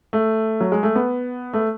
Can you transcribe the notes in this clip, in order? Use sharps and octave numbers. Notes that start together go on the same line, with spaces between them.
A3
F#3
G#3
A3
B3
A3